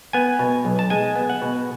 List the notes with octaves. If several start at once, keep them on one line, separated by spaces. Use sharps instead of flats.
B3 G#5
B2
B1
A5
G#3 G#5
B3
F#5
B2